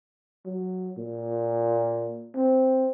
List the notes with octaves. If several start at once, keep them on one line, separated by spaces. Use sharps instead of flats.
F#3
A#2
C4